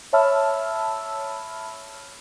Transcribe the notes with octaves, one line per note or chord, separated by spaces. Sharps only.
C#5 E5 A5 B5 E6 F6